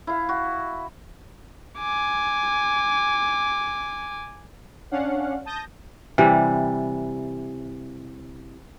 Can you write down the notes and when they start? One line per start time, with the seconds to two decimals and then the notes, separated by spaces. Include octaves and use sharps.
0.07 E4 F5
0.29 F#4
1.79 G#5 D6
4.91 C#4 D4 F5 F#5
5.45 A5 D#6 G6 A#6
6.18 C3 E3 G3